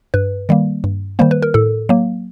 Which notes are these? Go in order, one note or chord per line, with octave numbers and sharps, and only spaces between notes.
G2 B4
D#3 G3 A#3
G2
D#3 G3 A#3 C5
B4
A#4
A2 A4
F#3 A#3